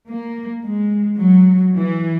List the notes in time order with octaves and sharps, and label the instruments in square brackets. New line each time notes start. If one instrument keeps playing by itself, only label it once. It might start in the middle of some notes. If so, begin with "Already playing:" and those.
[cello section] A#3
G#3
F#3
E3